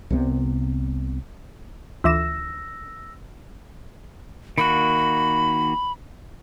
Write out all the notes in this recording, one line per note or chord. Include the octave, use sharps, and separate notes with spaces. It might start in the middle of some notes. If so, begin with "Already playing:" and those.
C2 C3 G#3 B3
D2 E3 F4 E5 D6 E6 A#6 E7
D#3 A#3 F#4 B5